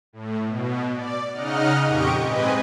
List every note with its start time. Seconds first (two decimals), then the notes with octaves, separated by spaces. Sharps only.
0.13 A2
0.45 B2
0.93 D5
1.31 C#3 D#4 D#5 F#5 F6
1.85 F2 A#2 G4 D#5 C#6 D7
2.23 G#2 C4 B4 D#5 G#5